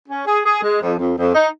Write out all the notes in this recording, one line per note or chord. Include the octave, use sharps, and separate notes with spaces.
C#4
G#4
G#4
G#3
F2
F2
F2
D#4